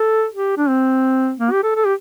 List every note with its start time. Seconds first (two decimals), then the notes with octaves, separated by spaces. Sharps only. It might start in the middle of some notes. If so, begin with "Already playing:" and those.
Already playing: A4
0.33 G4
0.57 D4
0.69 C4
1.40 A#3
1.52 G4
1.63 A4
1.76 A4
1.85 G4